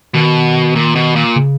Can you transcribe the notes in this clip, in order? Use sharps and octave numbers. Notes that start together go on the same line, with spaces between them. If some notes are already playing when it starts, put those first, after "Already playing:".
B2 D#3
A#2
B2
A#2
C#3